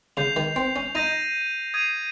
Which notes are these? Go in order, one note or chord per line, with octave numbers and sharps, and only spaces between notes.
C#3 G6 C7 F7
D#3
C4
C#4
D#4 G6 A#6 D#7
D#6 G#6 C7 D#7